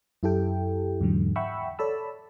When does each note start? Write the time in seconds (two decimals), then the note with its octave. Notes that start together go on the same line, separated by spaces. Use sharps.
0.23 F#2 E4 G4 A4 G5
1.01 E2 G#2 D3 F#3
1.36 E5 F#5 G5 B5 C#6 E6
1.79 A4 C#5 D5 A5 B5 E6